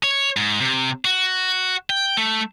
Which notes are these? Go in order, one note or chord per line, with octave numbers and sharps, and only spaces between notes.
C#5
G#2
C3
F#4
G5
A3